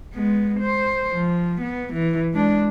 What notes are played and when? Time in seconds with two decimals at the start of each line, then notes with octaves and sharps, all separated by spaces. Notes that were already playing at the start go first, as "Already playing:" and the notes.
0.14 G#3 B3
0.60 C5
1.11 F3
1.61 B3
1.94 E3
2.34 G#3 D4